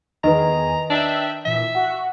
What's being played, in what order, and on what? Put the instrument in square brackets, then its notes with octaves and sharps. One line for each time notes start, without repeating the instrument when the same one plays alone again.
[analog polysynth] E2 G#4 [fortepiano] D#3 [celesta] B4 D#5 [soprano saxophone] A#5
[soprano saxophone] D4 [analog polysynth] E5 G5
[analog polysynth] A#2 E3 [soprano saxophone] E5
[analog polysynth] F#4 [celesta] F#5